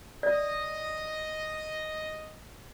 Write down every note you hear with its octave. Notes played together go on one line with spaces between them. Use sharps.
D5 D#5